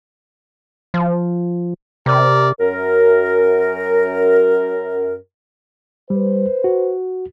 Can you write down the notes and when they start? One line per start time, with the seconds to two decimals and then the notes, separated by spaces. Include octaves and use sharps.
0.94 F3
2.06 C3 A#4 D5
2.60 F#2 A#4
6.10 G3 B4 C5
6.64 F#4